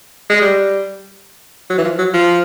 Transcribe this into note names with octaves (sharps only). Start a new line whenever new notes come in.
G#3
G3
F#3
E3
F3
F#3
F3